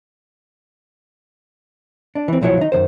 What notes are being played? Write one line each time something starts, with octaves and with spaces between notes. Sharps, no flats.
D4
E3 C4
B1 A#2 F3 F#3 E4 C#5
D#3 D#4
F#2 C3 D#3 C5